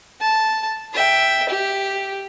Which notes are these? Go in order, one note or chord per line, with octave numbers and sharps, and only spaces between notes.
A5
E5 G5
G4